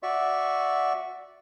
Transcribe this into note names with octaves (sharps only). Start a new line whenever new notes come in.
F#4 D5 E5 C#6